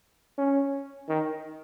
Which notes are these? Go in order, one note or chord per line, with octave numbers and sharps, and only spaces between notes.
C#4
D#3